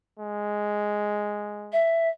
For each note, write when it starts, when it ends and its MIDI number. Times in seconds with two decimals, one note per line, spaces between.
0.20 1.80 56
1.72 2.09 76